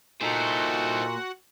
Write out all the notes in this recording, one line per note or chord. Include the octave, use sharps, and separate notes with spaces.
A#2 D#4 E4 F#4 A4 C5 F#5